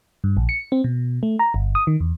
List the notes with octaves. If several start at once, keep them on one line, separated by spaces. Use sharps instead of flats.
G2
A#1
C#7
C4
B2
A3
A#5
G1
D#6
D#3
E2